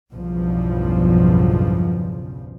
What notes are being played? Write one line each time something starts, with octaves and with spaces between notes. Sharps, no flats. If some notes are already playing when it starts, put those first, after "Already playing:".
B1 E2 G2 C#3 F3